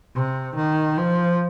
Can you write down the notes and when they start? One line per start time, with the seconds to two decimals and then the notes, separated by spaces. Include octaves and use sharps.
0.15 C3
0.56 D#3
0.97 F3